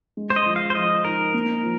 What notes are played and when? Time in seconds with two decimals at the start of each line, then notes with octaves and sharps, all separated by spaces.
0.17 G#3
0.30 C5
0.36 D#5
0.46 F3
0.56 F5
0.70 C5
0.75 F3 D#5
1.04 D#4 A#4
1.34 A#3
1.63 F3